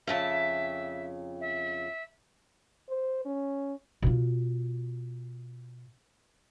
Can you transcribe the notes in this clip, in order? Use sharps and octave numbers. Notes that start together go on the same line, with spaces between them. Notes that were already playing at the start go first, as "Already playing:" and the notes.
F2 C#3 E5 A5
E5
C5
C#4
B2 F4